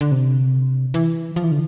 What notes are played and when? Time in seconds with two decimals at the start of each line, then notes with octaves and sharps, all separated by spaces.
0.01 D3
0.12 C3
0.94 E3
1.36 F3
1.44 E3
1.51 D3